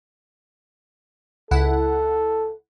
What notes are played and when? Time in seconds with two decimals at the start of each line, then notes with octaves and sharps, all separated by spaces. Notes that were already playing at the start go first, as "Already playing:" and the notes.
1.51 C#2 E4 A4 F#5